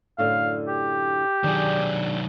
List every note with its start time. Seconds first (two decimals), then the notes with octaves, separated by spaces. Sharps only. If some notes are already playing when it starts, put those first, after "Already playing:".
0.18 F#2 A2 D3 F5
0.68 G4
1.44 D#3 F#3 D4 G#4